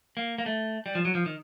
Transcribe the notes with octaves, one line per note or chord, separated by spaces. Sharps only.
A#3
A#3
A3
G3
F3
F#3
F3
D#3